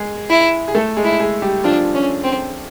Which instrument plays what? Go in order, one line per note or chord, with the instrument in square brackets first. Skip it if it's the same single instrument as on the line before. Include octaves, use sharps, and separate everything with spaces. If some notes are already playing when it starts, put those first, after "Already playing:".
Already playing: [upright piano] G#3 G#4
[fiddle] E4
[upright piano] G#4
A3 A4
G#3 G#4
[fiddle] E4
[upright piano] G#3 G#4
G3 G4
[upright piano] F3 F4 [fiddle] D4
[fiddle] C#4
C4